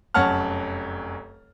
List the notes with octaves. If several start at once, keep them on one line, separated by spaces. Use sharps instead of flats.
F1 F#2 C#5 F#5 A5 F6